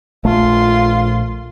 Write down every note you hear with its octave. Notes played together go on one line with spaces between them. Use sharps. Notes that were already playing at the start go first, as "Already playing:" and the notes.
A#1 A3 F4 C6